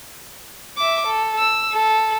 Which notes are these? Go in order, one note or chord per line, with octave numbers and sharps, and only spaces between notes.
E5 D6
A4
E6
A4